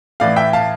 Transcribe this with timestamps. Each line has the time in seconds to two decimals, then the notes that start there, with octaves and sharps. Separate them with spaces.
0.20 A2 E3 D5 F5
0.36 E5 G5
0.53 F5 A5